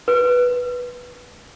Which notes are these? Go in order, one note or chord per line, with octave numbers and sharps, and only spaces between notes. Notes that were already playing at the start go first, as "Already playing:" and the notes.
B4